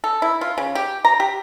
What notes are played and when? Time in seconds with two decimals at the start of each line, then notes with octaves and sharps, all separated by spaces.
0.04 A4
0.22 E4
0.41 F4
0.58 C#3
0.75 G4
1.05 A#5
1.20 G4